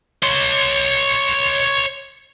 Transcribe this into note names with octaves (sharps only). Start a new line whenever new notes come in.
C#5 C6